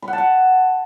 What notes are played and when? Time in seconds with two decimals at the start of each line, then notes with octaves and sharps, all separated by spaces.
0.02 B5
0.08 F#5
0.13 A5
0.18 F#5